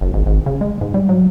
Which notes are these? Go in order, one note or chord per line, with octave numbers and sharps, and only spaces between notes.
F#1
G#1
G#1
C#3
G#3
G#2
G3
F#3